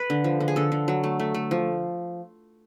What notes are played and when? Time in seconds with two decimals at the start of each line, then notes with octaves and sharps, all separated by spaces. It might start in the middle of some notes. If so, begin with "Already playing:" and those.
Already playing: B4
0.10 D3
0.24 F3
0.40 D3
0.48 G#4
0.56 D3 A4
0.72 D3
0.88 F#3
1.04 A3
1.20 A3
1.34 A3
1.51 F3